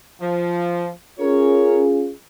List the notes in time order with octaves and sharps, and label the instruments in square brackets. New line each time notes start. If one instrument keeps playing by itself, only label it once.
[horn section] F3
[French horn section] C#4 F4 G#4 [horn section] A#4 C#5